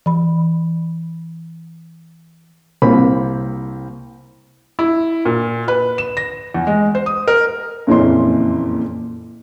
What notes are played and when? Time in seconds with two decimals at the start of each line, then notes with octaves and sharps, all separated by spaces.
0.06 E3 B5
2.82 C2 A#3 C4 B5
4.79 E4
5.25 A#2
5.68 B4
5.98 E7
6.17 A#6
6.54 E2
6.67 G#3
6.95 C5
7.06 D#6
7.28 A#4
7.87 F#1 F2 A#2 E3 C#4 C6